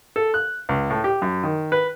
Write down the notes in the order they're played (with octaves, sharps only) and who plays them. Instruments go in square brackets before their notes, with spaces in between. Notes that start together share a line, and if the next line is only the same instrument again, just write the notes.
[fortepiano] A4
F#6
C#2
A2
G4
F#2
D#3
B4